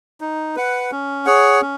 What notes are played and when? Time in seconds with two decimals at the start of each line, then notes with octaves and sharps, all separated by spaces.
0.21 D#4
0.56 B4 F#5
0.92 C#4
1.26 G#4 C#5 F#5
1.62 C#4